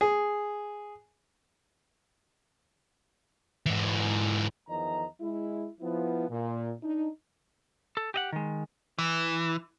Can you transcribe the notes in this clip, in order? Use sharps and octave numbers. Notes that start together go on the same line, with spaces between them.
G#4
G#2 E3
E2 D#3 F3 D#5 A#5
G#3 E4
F3 B3 E4
A#2
D4 D#4
A4
G4 D#5 F#5
D#3 G#3
E3